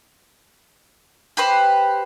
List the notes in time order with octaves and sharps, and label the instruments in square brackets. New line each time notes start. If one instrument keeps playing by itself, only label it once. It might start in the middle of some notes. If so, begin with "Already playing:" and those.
[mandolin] G4 B4 C5